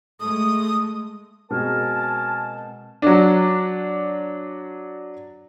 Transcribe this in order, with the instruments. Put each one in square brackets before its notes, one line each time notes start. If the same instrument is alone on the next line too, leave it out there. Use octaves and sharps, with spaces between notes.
[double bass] G#3 A3 [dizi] D#6
[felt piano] B2 G#3 C4 [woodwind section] A#4 G#5 A5
[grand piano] F#3 D4